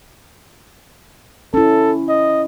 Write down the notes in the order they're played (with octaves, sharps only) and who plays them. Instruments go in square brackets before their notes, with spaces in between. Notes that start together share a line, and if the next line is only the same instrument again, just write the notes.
[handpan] C#4 E4 [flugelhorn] A4
[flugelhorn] D#5